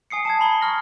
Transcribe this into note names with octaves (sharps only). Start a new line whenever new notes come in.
G#5 D#6 C7 C#7
A5 D#6 G#6
A#5 B5 G7
C#6 F6 A#6